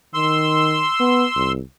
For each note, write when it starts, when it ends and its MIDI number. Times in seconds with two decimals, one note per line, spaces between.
0.14 0.85 51
0.14 1.52 84
0.14 1.52 88
1.00 1.25 59
1.36 1.61 36